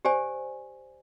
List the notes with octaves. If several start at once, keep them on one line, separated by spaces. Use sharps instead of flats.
G4 C5 D5 G#5